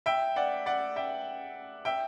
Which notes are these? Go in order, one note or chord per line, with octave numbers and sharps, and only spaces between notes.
E5 G5
D5 F#5
D5 F#5
E5 G5
E5 G5